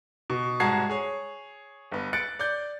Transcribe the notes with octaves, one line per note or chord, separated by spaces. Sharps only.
B2
C2 G#2 F#4 A5 G#6 C7
G#4 C#5
G1 B3
F#6 A6 C#7 D7
D5 G6